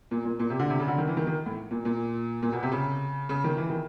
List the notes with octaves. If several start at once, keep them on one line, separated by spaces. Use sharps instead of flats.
A#2
A#2
A#2
C3
D3
C3
C#3
D3
D#3
E3
D#3
D#3
A2
A#2
A#2
A#2
B2
C3
C#3
C#3
D#3
E3
D#3